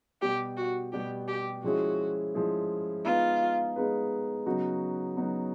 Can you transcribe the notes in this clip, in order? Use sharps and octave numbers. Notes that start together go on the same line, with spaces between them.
B2 G3 B3 G4
F#4
B2 G3 B3 G4
G4
F3 G#3 C#4 E4 F#4 G#4
F3 G#3 C#4 E4 G#4
G#3 B3 D#4 F4 G#4 B4
G#3 B3 D#4 G#4 B4
C#3 F#3 B3 D#4 F#4
C#3 F#3 B3 D#4 F#4